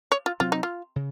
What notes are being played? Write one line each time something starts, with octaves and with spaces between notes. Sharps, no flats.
C#5
F4
C3 F#3 C4 F4
D#4
F4
C#3